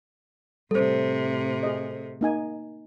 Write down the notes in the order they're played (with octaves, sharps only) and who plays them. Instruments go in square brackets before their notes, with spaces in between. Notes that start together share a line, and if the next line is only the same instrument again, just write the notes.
[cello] A2 C3 [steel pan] G3 [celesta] A4 C5
[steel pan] G#4 D#5
A#3 D#4 G#5